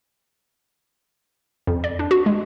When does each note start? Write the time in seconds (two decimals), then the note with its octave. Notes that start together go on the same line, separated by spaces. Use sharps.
1.67 F2
1.84 D5
1.99 D4
2.11 F#4
2.26 G#3